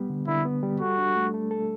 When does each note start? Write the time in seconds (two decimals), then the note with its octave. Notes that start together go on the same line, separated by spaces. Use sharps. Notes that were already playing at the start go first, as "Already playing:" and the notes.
Already playing: G3 B3
0.10 D3
0.27 D3 E4
0.45 B3
0.63 G3
0.80 F#4 A4
0.98 D4
1.16 A3
1.34 A3
1.51 A4